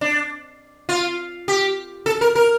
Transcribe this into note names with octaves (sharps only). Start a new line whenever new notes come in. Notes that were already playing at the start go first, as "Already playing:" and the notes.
D4
F4
G4
A4
A#4
A#4